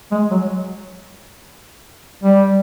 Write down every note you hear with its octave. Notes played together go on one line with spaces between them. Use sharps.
G#3
F#3
G3